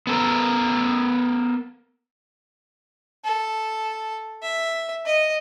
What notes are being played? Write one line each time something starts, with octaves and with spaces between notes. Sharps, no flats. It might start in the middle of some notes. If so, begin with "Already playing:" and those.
B3 A4 A#4
A4
E5
D#5